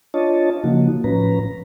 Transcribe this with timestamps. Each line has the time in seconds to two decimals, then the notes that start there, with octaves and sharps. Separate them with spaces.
0.14 D4 F4 C#5 D#5 A5
0.64 C#3 F3 A#3 D#4 F#4
1.04 A2 F3 C#4 B4 A#5